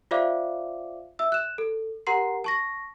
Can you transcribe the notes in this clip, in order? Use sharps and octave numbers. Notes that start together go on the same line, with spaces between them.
F4 C5 D5 E5 F5 D6
E5 E6
F#6 E7
A4
G4 A#4 F#5 A#5 C6 C7
A5 C#6 A#6